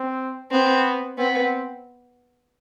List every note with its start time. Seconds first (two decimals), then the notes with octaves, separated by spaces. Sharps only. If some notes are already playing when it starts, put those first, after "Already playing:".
Already playing: C4
0.51 B3 C4
1.18 B3 C4